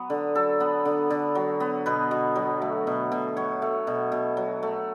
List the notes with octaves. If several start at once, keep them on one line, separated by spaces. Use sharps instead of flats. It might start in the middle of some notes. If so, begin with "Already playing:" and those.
Already playing: F#3 B3
D3
F#3 A4
B3
D3
D3
F#3
B3
B2 B4
B2
F#3
A3
B2
B2
F#3 C#5
A3
B2
B2
F#3
A3